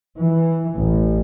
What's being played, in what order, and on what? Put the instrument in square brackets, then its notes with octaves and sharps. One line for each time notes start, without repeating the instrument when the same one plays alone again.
[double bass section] E3
A1